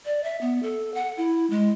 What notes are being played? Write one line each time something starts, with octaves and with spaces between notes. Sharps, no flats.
D5
E5
B3
A4
F#5
E4
G#3